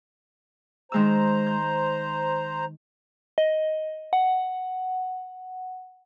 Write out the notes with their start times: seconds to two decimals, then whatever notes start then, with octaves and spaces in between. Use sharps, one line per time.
0.92 D#3 G#3 C5 A#5 E6
1.47 G6
3.38 D#5
4.13 F#5